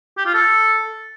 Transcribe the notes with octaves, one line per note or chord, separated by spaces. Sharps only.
G4
F4
A4